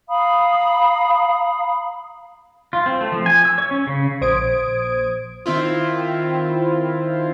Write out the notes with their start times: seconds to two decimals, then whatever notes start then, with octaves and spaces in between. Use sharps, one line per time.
0.09 F5 A#5 B5 D#6
2.73 F4
2.86 C4
3.01 A3
3.12 F3
3.26 G#5
3.45 E6
3.58 C#5
3.71 C#4
3.87 C#3
4.21 A#1 C5 D#6 G#6 D7
5.46 D#3 C4 E4 F4